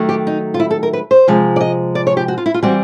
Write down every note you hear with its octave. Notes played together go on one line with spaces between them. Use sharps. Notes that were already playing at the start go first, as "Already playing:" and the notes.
Already playing: D#3 F#3 A3
G4
D#4
F4
E4
A4
A#4
B4
C5
C3 F3 G#3
D5
D#5
D5
C#5
G4
F#4
F4
E4
F4
E3 G3 C4 F#4